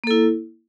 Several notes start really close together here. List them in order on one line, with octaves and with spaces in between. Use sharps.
A#3 A4 E4